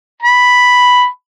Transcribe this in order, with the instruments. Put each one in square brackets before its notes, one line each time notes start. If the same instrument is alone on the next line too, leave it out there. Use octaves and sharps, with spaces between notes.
[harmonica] B5